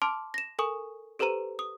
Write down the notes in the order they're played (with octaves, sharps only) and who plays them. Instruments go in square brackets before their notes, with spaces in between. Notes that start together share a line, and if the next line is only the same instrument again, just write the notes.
[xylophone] A5 C6 D6 F6
A#6 E7
A4 A#4 G#5 C#6 D#6
G4 A4 B4 C5 A#5 D#7
D#6